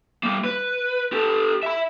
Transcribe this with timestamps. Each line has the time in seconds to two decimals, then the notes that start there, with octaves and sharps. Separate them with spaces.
0.23 G3 A#3
0.44 B4
1.13 G4 A4
1.63 E5 B5